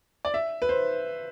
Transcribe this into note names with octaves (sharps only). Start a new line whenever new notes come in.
D5
E5
B4
C5